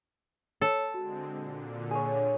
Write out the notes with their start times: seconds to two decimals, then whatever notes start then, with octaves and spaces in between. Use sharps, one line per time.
0.61 A4 C#5
0.94 D3 G#3 C4 F#4
1.29 A#2 D3
1.91 G#4 C#5